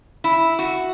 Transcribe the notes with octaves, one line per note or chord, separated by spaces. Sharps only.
E4
F#4